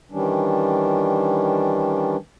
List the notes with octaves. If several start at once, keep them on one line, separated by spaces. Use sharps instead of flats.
D#3 E3 G3 C#4 D4